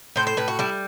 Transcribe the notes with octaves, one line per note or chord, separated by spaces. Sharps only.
A2 C5
C5
A2 B4
F#4
G3 E4